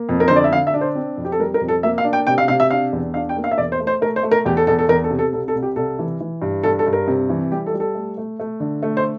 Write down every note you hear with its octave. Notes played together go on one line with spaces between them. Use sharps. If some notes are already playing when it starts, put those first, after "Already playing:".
Already playing: A#3
F2
A#4
D3 C5
D5
E5
D3 F5
E5
D4
C5
C4
F2
G4
A4
G3 A#4
A#4
F2
A4
A#3 E5
F5
D4
G5
C3 G5
F5
C3 F5
E5
D4 F5
E2
D4 F5
G5
A#3
F5
E5
E2 D5
C5
A3
C5
A3 A#4
C5
A3
A#4
E2 G4
A4
E2 A4
A4
E2 A#4
A4
C3
A4
C2 A4
A4
C2
G4
C2 A4
E3
E3
G2
G2 A4
A4
G2
A#4
C3
E3
G3 G4
A4
G3
A4
A3
A3
A3
D3
A3
C5